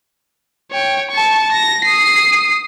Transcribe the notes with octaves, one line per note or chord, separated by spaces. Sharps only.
C#5 G5
A5 C#6
A#6
D#6 C7